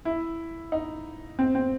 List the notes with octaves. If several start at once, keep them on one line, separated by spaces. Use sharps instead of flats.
E4
D#4
C4
C4